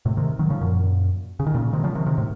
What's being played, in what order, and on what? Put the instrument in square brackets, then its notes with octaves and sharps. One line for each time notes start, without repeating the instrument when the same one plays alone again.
[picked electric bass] A2 C3
C3 D#3
D#3 F#3
C#3 F3
F#2 A#2
C#3
D#3
A#2 C#3
C3 D#3
C#3 F3
C3 D#3
C3 D#3
A2 C3